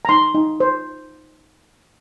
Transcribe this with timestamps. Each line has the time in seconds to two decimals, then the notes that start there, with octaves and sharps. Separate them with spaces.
0.05 A#5
0.09 D#4 C6
0.35 D#4
0.60 C5